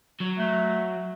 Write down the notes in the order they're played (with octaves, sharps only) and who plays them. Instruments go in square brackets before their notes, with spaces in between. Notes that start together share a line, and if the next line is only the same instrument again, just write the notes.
[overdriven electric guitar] F#3
[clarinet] A3